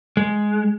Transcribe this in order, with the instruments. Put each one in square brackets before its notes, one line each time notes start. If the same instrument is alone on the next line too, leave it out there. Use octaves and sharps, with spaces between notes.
[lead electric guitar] G#3